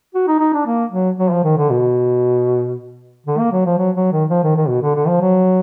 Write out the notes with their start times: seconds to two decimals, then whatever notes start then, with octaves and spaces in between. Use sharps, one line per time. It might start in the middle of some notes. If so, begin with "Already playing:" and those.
0.15 F#4
0.28 D#4
0.40 D#4
0.54 D4
0.67 A#3
0.92 F#3
1.19 F#3
1.31 F3
1.44 D#3
1.58 D3
1.70 B2
3.27 D3
3.39 A#3
3.52 F#3
3.66 F3
3.78 F#3
3.96 F#3
4.12 D#3
4.30 F3
4.44 D#3
4.57 D#3
4.68 B2
4.82 D3
4.95 D3
5.07 F3
5.21 F#3